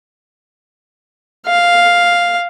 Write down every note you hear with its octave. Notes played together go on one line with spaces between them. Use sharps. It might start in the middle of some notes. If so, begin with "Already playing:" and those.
F5